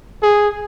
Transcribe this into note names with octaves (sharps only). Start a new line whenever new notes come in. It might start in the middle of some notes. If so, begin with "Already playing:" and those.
G#4